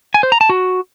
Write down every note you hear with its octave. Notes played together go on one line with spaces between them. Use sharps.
G#5
C5
A#5
A5
F#4